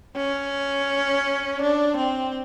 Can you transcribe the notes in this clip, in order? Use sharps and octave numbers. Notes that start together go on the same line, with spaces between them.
C#4
D4
C4